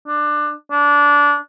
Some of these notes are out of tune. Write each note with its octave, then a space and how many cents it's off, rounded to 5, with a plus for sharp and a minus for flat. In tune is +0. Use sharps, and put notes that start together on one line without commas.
D4 +20
D4 -20